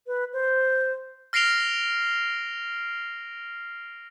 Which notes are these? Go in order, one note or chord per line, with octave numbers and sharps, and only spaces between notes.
B4
C5
F6 A#6 C7 D7 F7 G7